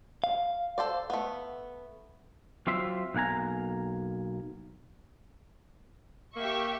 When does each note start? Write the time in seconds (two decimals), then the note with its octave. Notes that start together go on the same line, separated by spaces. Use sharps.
0.24 F5
0.78 A4 C5 D5
1.10 A3 B3
2.67 F#3 C4 F4 E5 C6
3.15 B1 A#3 F#5 G#5 A#5
6.36 A#3 G4 E5 C#6